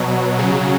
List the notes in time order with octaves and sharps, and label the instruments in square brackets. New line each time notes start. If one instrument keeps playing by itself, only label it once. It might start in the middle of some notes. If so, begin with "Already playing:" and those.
Already playing: [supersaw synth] B2 F#3
C#3 F#3